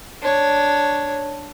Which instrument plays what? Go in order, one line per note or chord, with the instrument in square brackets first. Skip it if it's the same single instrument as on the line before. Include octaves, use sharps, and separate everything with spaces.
[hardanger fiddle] D4 C#5